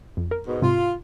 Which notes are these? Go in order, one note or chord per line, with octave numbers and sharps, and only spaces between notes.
F2
A#4
G#2 B2
G#2 C3 F4